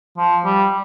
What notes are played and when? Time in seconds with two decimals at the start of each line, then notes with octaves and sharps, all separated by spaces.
0.18 F3
0.45 G3